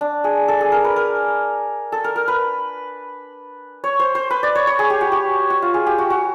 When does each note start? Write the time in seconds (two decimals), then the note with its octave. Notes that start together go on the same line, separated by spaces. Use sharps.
0.01 D4
0.24 G#4
0.48 A4
0.61 G#4
0.72 A#4
0.84 B4
0.96 A#4
1.92 A4
2.04 A#4
2.16 A#4
2.28 B4
3.84 C#5
3.99 C5
4.15 C5
4.30 B4
4.43 D5
4.55 C#5
4.67 C#5
4.79 G#4
4.90 G4
5.01 F#4
5.12 G4
5.50 F#4
5.62 F4
5.74 G#4
5.86 G4
5.98 F#4
6.10 F#4